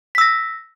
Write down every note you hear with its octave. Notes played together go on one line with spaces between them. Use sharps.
E6 A#6 B6